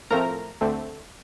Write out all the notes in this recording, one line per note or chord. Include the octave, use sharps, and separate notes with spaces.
A2 F3 A3 C4 A#4 A#5
D2 D3 A3 C4